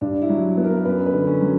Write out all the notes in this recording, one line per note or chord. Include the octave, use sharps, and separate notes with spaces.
G2 D4
E4
F#3
B3
A#4
F#2 B4
B4
D3
C#4
F#3